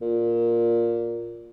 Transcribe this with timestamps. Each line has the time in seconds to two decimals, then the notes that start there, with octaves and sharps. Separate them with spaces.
0.01 A#2